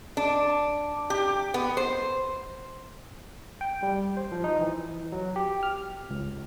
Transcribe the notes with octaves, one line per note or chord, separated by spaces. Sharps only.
D4
G4
B3
C5
G5
G3
C5
F3
D#4
E3
F#3
G4
F6
C#2